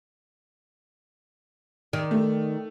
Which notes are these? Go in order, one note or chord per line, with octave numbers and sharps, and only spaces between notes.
D#3 D5
A3